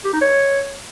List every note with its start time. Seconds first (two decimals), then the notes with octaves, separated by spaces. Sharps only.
0.05 G4
0.13 D#4
0.21 C#5